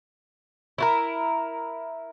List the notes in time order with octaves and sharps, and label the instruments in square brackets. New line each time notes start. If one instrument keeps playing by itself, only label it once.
[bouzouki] E4 F4 A#4